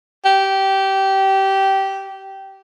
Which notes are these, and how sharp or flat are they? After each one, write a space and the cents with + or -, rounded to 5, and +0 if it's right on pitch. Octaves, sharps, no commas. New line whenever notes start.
G4 -15